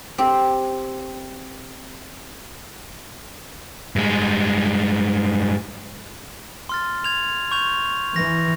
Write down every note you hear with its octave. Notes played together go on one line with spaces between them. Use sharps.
C4 G4
G2 G#3
C6 F6 A6
G#6 F7
C#6 G6 F7
E3 A#6